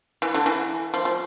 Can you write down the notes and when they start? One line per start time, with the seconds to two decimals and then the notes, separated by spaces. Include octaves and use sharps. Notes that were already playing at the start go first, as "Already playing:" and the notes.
0.22 E3
0.34 D3
0.46 E3
0.94 F3
1.05 F3